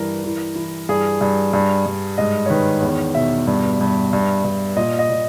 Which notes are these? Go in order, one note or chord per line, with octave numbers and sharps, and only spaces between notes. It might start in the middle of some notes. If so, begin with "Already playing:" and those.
Already playing: G2 E3 A#4
E3
E3
G2 G#4
G2
G2
G2
G#2 D#5
C#5
D#3 B4
E2 C#5
B2 E5
G2
G2
G2
G2
A#2 D#5
D#5
A#2